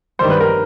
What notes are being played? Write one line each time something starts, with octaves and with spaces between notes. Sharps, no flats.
G2 D#3 G3 C5
B4
A#4